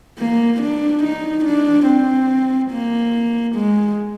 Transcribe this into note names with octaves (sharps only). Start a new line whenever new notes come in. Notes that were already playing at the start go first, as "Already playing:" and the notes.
A#3
D4
D#4
D4
C4
A#3
G#3